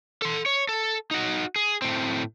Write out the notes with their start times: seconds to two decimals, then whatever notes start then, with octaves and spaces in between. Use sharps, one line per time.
0.22 A4 C6
0.46 C#5
0.69 A4
1.11 D#4 F#4
1.56 G#4
1.82 A2 C4